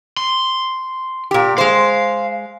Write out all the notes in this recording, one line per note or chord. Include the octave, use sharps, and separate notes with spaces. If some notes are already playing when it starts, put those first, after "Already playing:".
C6
A#2 G4
G#3 C5 F5